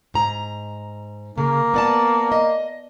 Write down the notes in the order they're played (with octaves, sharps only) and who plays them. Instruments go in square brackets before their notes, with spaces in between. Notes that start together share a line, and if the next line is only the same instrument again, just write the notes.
[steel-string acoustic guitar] G#2 A#5
[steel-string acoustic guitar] C#3 [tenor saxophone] A#3
[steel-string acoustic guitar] B3 D5 A5
D#5